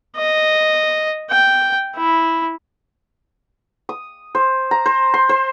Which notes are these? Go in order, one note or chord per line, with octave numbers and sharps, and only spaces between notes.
D#5
G5
E4
D#6
C5
A#5
C5
C6
C5